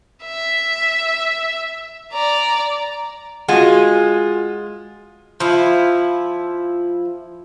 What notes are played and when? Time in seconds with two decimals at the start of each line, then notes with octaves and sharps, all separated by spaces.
0.24 E5
2.13 D5 A#5
3.48 G#3 F4 F#4 F#5
5.40 F3 E4